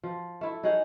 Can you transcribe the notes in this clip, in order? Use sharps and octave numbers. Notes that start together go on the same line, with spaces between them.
F3
A3 E4
D#4 G#4 C#5 F#5